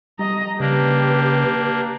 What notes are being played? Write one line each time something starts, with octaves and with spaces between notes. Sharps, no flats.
G3 D#5 A#5
C#3 A#3 D4 G4 B4